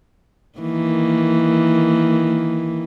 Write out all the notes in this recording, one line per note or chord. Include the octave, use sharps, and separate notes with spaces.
D#3 E3 A#3